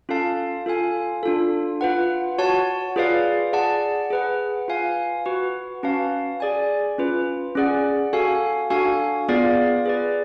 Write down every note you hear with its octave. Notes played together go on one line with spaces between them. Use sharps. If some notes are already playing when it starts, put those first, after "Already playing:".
C#4 F4 A4 F5 A5
F4 A4 F5 G#5
D4 F4 A4
F4 B4 F#5
F#4 C#5 F#5 A5
F4 G#4 B4 D5 F5
G#4 D5 F#5 A5
G#4 B4 F#5
F4 B4 F5 G#5
F#4 B4 F#5
C#4 F#4 B4 F5 A5
G#4 D5 G#5
C#4 F4 B4
C#4 G#4 D5 F#5
F#4 A4 F5 G#5
D4 F#4 A4 F5 G#5
B3 F4 G#4 D5 F5
G#4 B4 D5